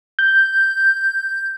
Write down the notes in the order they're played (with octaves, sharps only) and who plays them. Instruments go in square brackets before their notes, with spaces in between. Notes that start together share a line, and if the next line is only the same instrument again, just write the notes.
[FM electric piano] G6